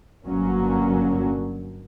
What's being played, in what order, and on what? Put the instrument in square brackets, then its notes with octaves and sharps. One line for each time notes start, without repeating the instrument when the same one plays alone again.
[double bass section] G1 D3 F#3 A#3 C#4